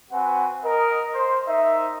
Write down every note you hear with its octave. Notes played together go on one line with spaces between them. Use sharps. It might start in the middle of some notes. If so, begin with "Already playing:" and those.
C4 F#4 B4 F#5 G#5
A#4 D#5
C5
D#4 A#4 E5